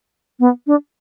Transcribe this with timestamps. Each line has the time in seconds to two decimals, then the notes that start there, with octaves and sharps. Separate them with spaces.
0.40 B3
0.67 D4